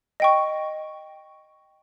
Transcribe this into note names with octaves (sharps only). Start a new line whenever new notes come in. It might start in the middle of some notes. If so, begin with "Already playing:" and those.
D#5 G5 C#6